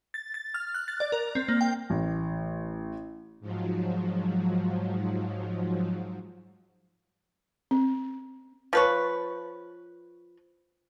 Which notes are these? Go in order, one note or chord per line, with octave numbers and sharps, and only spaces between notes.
A6
A6
F6
F#6
A6
D5
A#4
C4
A#3
G5
A1
G#2 F3 F#3
C4
F3 B4 C#5